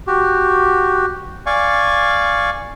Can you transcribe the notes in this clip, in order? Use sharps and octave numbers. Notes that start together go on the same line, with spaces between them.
F#4 G4
D5 F5 G#5 C#6